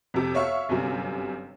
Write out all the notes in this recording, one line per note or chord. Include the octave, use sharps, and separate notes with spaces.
F2 C3
C#5 E5 F5 C#6
G1 F#2 C3